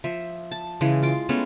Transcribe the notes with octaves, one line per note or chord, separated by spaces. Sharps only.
F3 E5
A5
C#3 E3 G#3
F4 D6
G#3 A3 B3 C#4